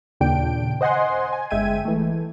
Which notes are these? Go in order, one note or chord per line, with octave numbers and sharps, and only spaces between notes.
D#2 A#2 C#3 D4 G5 D7
C5 D#5 F#5 G#5 C6
G#5
G1 G#3 E5 G5 G#6 D#7
E3 A3